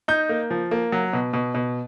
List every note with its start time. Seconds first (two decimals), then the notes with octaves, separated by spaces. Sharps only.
0.08 D#4 G6
0.29 A#3
0.51 F3
0.71 A#3
0.92 F#3
1.13 B2
1.33 B2
1.55 B2